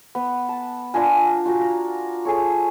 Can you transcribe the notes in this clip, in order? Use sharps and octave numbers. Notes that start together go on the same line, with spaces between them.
B3
A5
D4 F4 A#4 G#5
F4 F#4 A#4
A#5
G#4 A4 C#5